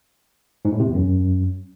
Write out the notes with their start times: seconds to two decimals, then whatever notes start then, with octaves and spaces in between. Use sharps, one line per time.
0.65 G#2
0.72 A2
0.80 C3
0.87 E2
0.95 F#2